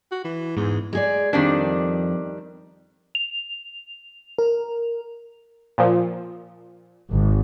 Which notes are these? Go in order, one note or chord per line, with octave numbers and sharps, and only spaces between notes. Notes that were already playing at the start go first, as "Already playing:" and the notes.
F#4
E3
E2 G#2
G#3 G#4 D5
F2 D#3 G3 D4
F7
A#4
A#2 F3
G#1